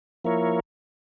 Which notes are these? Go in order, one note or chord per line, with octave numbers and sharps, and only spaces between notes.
F3 A#3 E4 A#4 C#5